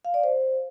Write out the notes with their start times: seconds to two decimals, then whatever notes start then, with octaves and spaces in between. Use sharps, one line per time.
0.05 F5
0.14 D5
0.24 C5